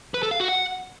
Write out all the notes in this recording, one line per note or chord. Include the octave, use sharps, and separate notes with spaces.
B4
A4
F5
F#4
F#5